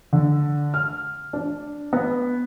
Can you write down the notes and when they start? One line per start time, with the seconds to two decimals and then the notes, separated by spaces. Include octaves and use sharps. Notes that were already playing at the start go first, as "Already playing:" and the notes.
0.13 D3
0.74 F6
1.33 D4
1.93 B3